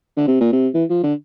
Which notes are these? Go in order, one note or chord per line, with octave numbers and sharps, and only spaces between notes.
D3
C3
A#2
C3
E3
F3
D3